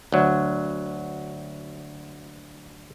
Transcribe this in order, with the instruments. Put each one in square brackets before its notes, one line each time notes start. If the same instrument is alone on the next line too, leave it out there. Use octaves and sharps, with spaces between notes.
[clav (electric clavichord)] D2 F#3